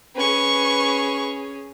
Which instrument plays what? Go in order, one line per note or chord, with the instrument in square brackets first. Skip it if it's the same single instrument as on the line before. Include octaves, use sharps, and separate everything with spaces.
[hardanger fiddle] C#4 G#4 [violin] B4 C#6